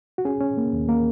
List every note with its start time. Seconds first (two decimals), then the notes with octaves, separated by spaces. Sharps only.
0.18 F#4
0.25 C#4 G#4
0.41 C#4
0.57 A#3
0.73 D#2
0.89 A#3 A#4